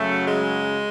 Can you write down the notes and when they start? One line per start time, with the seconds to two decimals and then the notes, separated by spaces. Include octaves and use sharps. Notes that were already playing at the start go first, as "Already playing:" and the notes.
Already playing: F#2 C#3 F#3 A3
0.28 G#3